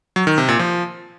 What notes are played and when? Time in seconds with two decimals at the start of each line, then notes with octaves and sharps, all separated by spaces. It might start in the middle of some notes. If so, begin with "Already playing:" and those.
0.16 F#3
0.27 D#3
0.38 C3
0.49 A#2
0.59 F3